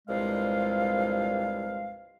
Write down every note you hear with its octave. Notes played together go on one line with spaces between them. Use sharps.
C2 G2 A#2 F3 G#3 F5